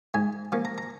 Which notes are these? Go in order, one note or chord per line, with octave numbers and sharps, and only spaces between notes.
G#2 G#5
F3 A#3 C#4
A#5
A#5